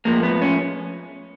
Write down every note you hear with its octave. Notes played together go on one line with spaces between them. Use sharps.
A2 F3 G#3 A#3
B3
C#4